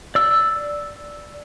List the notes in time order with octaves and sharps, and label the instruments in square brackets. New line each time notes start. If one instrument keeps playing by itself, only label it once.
[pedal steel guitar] D5 E6